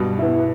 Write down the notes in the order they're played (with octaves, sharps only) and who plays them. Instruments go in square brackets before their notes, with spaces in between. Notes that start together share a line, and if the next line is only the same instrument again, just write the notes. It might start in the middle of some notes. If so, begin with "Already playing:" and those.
Already playing: [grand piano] G2 B2
[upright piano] B3 E4